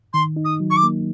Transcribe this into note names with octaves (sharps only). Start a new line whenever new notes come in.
D#3 C6
D#4
D#6
F#3
C#6
D6
A#3